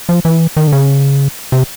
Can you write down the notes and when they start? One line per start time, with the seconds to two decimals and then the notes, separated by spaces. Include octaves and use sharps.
0.09 F3
0.25 E3
0.57 D#3
0.67 D3
0.72 C#3
1.52 C3